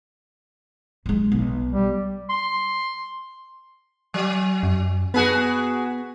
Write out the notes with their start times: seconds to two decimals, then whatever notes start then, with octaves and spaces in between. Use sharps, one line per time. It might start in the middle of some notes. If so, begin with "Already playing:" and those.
1.06 F#3 G#3
1.32 B1
1.73 G3
2.30 C6
4.14 F#3
4.63 F#2
5.14 B3 F#4 G#4 B4